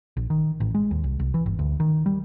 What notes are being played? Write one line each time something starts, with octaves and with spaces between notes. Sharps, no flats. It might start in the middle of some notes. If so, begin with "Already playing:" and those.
A#1
D#3
A1
G#3
D#2
C2
C2
E3
G1
D2
D#3
G3